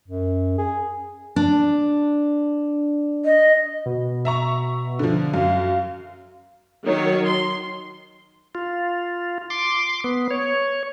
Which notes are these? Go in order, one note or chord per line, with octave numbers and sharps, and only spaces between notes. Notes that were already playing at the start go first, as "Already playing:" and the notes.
F#2
G#4
D4
D#5
B2
E5 A#5 C#6
D3 F3
F#2 F5
D#3 F#3 C#5
C6
F4
C6 D6
B3
C#5